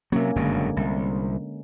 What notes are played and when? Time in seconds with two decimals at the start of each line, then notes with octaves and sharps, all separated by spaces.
0.12 C3 F#3 A#3 C#4
0.36 F#1 G2 B2 D3 G#3
0.76 C2